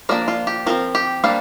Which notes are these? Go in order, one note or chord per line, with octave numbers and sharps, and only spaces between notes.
F3 A#3 D4 A#4 D5
F4
G4
F3 C4 F4 A#4
G4
G3 A#3 D4 C5 F5